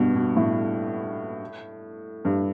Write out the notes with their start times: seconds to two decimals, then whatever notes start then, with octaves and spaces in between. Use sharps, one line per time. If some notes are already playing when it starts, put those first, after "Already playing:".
Already playing: G2 B2
0.15 B2
0.37 A2
2.25 G2